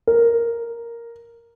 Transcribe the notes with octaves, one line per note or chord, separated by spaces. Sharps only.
A#4